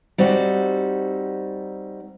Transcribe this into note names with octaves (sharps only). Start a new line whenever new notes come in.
G3 C4 D#4 F#4